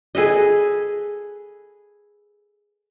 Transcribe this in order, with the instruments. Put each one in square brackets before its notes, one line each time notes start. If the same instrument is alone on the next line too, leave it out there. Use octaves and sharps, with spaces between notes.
[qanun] G#4 A4 B4 D#5